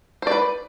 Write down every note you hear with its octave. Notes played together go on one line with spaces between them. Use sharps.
B4 C5 D5